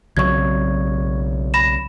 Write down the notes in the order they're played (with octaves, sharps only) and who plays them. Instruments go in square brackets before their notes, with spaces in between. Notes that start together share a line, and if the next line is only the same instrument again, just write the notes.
[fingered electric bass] B1 C#3 F#3 [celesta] C#6 G#6
[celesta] B5 A#6 E7